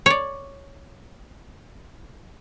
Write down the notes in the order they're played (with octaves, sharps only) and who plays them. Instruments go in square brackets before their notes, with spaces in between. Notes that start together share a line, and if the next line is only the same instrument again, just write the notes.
[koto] C#5 D5